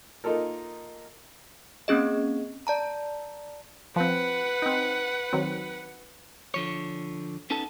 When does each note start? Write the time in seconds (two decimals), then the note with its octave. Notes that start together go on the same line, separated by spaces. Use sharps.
0.24 A#3 D#4 F4 A4 A#4
1.88 A#3 C4 C#4 G#4 D#5
2.67 D5 A5 A#5
3.96 F3 C4 B4 F#5
4.62 C4 D#4
5.33 D#3 F#3 C4
6.54 D3 F3 C#5
7.50 B3 C#4 D#4 A4 A5